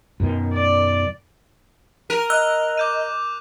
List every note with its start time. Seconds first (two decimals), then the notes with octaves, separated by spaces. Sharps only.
0.20 F#2 B2 D#3
0.53 D5
2.10 A#4 D#7 F7
2.30 D#5 E6 F#6
2.77 D6 G6 D#7